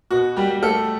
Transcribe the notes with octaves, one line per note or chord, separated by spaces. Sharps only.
B2 F#4
G3 G4
G3
A3 A4